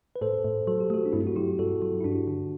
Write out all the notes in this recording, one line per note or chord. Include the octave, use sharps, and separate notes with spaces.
B4
A2 A4 C5
A2
F#3 A4
G4
A3 F#4 A4
D4
G2 C4 E4
F#4
F#3 E4 G4
G2 F#4 A4
F#3
E4
G2 D4 F#4
D3